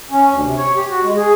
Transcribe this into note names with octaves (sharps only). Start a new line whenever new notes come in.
C#4
D2
C3
C#5
G4
F#4
G#3
G#4